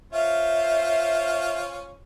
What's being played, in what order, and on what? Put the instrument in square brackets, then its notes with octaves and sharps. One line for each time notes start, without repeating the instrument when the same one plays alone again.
[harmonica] C#4 F4 C5 [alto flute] E5